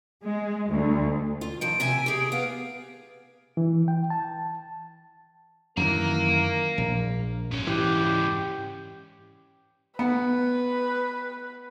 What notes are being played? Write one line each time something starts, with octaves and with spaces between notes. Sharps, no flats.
G#3
D2
F4
D#3 F3 D7
C3 E5 G#5
G4 G#4
B3 F5
E3
G5
A5
F#2 D#3 E3 A#4 F5 A#5
A#1
G#2 C#4
E3 G4
B3 B4